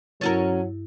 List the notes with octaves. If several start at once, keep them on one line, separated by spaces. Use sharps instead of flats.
G2 F#3 C#4 E4 A4 A#4 A6